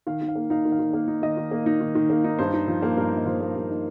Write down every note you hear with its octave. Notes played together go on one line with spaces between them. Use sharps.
D#3 F5
D#3
F5
A#3
D#4 F5
D#3
F5
D#3
A#3 F5
D#4
D#3 D#5
D#3
A#3
D#4
D#3
D#3
A#3
D#4
G2 C5
D#4
F3
A#3
G2 A#4
D#4
D#5
F3 C5
A#3
G2
D#4